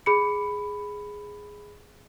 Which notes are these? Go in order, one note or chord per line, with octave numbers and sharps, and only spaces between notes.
G#4 B5 C#7